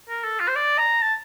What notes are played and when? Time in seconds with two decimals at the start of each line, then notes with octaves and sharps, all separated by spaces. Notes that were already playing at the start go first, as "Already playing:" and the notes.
0.09 A#4
0.24 A4
0.40 F4
0.48 C5
0.56 D5
0.78 A#5
1.02 A5